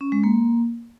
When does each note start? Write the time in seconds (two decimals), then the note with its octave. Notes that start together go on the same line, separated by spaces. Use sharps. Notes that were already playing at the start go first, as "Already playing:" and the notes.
0.01 C#4
0.12 G#3
0.23 A#3